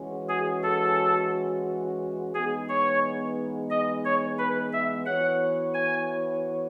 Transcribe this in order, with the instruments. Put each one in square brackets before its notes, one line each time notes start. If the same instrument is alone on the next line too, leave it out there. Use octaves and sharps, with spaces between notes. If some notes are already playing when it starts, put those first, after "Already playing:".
Already playing: [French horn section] E3 G#3 C#4 F#4
[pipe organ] G#4
A4
[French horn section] E3 G#3 B3 D#4 [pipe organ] G#4
[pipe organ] C#5
D#5
C#5
B4
E5
[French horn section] E3 B3 F#4 C#5 [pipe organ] F#5
[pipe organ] G#5